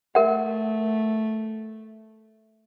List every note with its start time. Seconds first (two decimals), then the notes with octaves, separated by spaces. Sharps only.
0.15 A3 A#4 E5 F#5